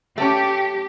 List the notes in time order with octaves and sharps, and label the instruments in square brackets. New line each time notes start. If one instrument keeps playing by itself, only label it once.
[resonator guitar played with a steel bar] A3 C4 C#4 [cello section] G4